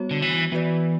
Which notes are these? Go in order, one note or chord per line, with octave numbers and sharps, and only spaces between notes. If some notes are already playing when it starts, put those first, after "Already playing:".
Already playing: G3 B3 F#4 C#5
D3
E3
E3 B3 F#4 B4 D5